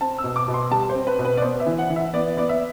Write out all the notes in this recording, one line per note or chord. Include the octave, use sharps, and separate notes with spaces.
C4 A5
E6
B2
D6
B2
C6
G3 A5
C5
C4
B4
B2
B4
D5
B3 C5
E5
E3
F#5
E3
E5
B3 D5
B3 D5
E5